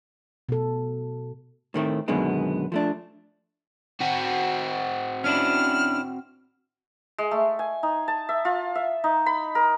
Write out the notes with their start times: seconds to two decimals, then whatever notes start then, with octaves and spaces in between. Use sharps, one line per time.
0.49 B2 A4
1.74 A2 D#3 A3 C4
2.08 F#2 B2 D3 D#3 G#3 B3
2.72 F3 A3 D4
4.01 C4 F#4
5.24 C#4 D4 E4 F6
7.18 G#3
7.31 A3
7.59 G#5
7.83 D#4
8.08 A5
8.29 E5
8.45 F4
8.75 E5
9.04 D#4
9.26 B5
9.55 A#4